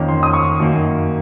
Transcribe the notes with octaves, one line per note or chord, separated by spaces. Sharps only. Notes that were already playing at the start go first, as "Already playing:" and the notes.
Already playing: F2 D#3 A#3 C#4
C6
D#6
C#6
F#2 D#3 A#3